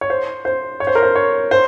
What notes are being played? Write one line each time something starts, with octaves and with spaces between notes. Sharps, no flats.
C#5
C5
C5
C#5
C5
A#4
C5
C#5
C5